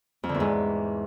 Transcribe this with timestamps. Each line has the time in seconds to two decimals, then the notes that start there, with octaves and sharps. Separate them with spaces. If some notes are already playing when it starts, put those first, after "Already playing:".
0.24 F2
0.29 D3
0.35 E2
0.40 G#2